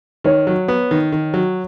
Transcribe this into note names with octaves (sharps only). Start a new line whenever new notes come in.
D#3 C#5
F#3
B3
D#3
D#3
F#3